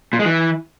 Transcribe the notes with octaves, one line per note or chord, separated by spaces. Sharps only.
A#2
G#3
E3